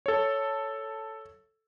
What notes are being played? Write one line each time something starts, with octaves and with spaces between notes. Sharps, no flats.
A4 C#5